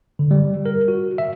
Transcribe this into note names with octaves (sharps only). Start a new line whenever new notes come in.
D3
G3
A#4
F#4
E5